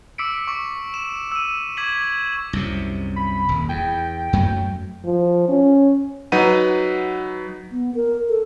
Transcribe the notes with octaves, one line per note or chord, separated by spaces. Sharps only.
D6 E6 B6 C#7 D7
C#6 D6
E7
E6 D#7
D6 G#6 B6 F#7
C2 F#2 C3
B5
D#1
E2 G5
F#2 F#3 A3
F3
C#4
F#3 D#4 B4 F#5 D#7
B3
A#4
A4